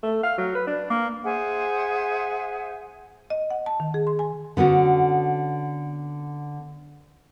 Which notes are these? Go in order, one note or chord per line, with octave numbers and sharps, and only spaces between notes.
A3
F5
F#3
B4
D4
A#3
G#4 C5 E5 F#5
D#5
F#5
A5
D#3
G#4
C6
G#5
D3 B3 C#4 F#4